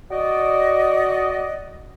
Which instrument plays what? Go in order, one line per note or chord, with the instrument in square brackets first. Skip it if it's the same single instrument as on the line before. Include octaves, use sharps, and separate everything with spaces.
[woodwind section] F#4 D5 D#5